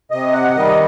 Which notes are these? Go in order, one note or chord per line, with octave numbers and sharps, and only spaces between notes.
C3 D#5
F#5
D#3 G3 D#5